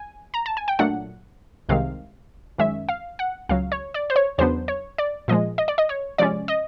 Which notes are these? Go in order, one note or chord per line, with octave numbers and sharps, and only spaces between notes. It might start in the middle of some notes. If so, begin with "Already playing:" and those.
Already playing: G#5
A#5
A5
G#5
G5
A#2 F#3 A3 D4 F#5
C2 C3 D#3 G#3 F5
F#2 D#3 G#3 C#4 E5
F5
F#5
C#2 C#3 F#3 F5
C#5
D5
C5
C#5
E2 C#3 F#3 B3 D4 C5
C#5
D5
A#2 F3 G#3 D#5
D#5
D5
D#5
C#5
C3 F3 G#3 C#4 D5
D#5